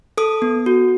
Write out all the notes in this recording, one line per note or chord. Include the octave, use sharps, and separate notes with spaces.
A4 D#6
B3
F#4